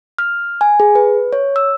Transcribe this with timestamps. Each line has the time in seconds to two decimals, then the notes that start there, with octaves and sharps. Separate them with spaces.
0.18 F6
0.61 G#5
0.80 G#4
0.95 B4
1.33 C#5
1.56 E6